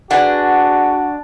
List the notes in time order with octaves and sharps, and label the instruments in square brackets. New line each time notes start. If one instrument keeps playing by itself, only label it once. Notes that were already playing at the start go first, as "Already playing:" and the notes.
[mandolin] D4 [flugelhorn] F#4 [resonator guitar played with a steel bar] G#4 B4 F#5